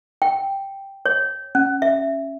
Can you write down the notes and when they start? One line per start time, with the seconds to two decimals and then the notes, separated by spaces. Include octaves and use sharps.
0.22 G5
1.06 C#5
1.55 C#4
1.82 E5